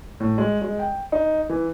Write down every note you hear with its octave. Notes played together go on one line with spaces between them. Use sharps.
A2
G#3
G#3
G5
D#4
E3